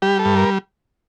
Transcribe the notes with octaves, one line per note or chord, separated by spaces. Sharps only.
G3 G4
A4
G2
A#4